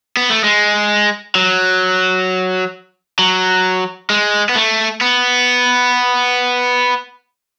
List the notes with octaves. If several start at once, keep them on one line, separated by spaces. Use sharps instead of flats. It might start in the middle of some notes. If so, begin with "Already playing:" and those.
B3
A3
G#3
F#3
F#3
G#3
B3
A3
B3